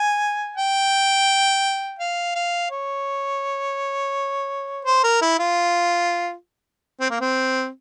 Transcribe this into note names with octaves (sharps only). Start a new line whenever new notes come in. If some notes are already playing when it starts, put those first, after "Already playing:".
Already playing: G#5
G5
F5
F5
C#5
C5
A#4
E4
F4
C4
A#3
C4